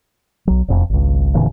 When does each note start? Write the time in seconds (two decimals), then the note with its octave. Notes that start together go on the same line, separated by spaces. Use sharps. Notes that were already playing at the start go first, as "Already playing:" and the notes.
0.47 B1 F#3
0.68 E1 F2
0.90 G#1 C#2
1.34 F1 A#2 D3 E3